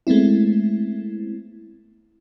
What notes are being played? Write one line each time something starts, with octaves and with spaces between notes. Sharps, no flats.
G#3 A3 B3 C4 E4